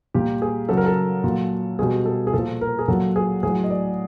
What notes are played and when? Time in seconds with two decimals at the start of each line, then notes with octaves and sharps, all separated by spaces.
0.14 A#2 G3 G4
0.42 G#4
0.69 C#3 F#3 A4
0.77 A#4
0.86 A4
1.24 A#2 F#3
1.79 B2 G3 G#4
2.06 A4
2.27 G#4
2.33 A#2 F3 A4
2.61 A#4
2.79 G#4
2.88 A#2 F#3 A4
3.16 G#4
3.43 A2 F#3 G#4
3.63 D#5
3.71 D5